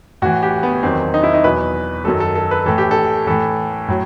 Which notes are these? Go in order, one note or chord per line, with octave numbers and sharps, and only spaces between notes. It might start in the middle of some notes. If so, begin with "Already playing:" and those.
A2 E3 F#4
G4
B3
E2 D#3 F#3 C4
D#4
E4
D#4
E2 B2 F#3 B4
F#2 D#3 F#3 A4
A4
A4
B4
A2 E3 A4
G4
A4
A2 E3 A4
A2 F#3